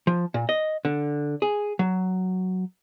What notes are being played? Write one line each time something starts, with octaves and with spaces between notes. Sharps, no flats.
F3
A#2
D#5
D3
G#4
F#3